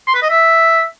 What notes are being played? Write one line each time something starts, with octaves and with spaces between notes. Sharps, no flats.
C6
B4
D#5
E5